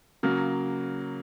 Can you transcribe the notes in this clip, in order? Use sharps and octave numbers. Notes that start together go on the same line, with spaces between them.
C#3 F#3 A#3